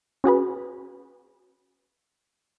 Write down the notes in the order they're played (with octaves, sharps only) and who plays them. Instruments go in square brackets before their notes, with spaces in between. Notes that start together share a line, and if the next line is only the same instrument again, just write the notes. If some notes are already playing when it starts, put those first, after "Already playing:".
[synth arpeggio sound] C#4 F#4 G#4 B4